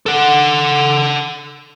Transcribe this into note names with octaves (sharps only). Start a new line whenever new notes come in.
A4 F#5